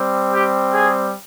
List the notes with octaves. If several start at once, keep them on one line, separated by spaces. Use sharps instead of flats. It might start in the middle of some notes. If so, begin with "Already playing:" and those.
Already playing: G3 C4
G4
G#4